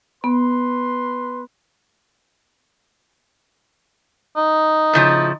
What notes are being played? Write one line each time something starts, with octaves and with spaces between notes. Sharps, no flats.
B3 B4 C6
D#4
A2 C#3 F3